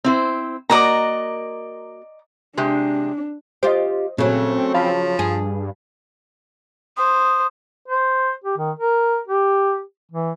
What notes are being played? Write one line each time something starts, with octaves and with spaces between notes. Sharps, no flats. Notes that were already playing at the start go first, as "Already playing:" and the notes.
C4 E4 C5
A#3 F#4 A#4 D5 D#5 A#5
C3 G#3 D4 G4
F4 G4 C5 D#5
A#2 C#3 F#3 A3 C4
F3 F5 A5 B5
G2 G#4
C5 D#6
C5
G4
D#3
A#4
G4
E3